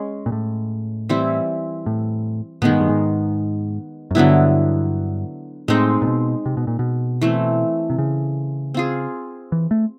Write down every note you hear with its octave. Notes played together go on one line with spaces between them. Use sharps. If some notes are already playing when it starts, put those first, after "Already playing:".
Already playing: G#3 C#4
A#2
A2
E3 G3 C4 E4
A2
A2 D#3 G#3 B3
G#2
G2
G#2
F#2
G2 D3 F#3 B3 E4
A2 G#3 C4 D#4
A#2
B2
C3
B2
A#2
B2
E3 A3 C4
C3
C#3
C4 F4 G#4
E3
A3